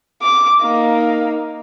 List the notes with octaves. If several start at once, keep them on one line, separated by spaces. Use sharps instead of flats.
D6
A#3 D#4